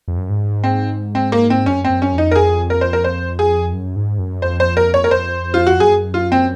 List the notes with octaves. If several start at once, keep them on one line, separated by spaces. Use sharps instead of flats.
F2
F#2
G#2
C4
C4
A#3
C4
F#2 C#4
C4
F#2
C#4
F2 D#4
A#4
G#4
A#4
C5
A#4
C5
G#4
F#2
G#2
F#2
F2 C5
C5
A#4
C#5
A#4
F2 C5
F4
F#4
F#2 G#4
F4
C4